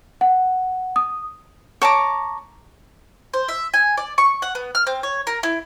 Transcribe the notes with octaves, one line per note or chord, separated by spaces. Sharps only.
F#5
D#6
C#5 A5 A#5 D6
C5
E5
G#5
D5
C#6
F#5
B3
F6
C4
C#5
A#4
E4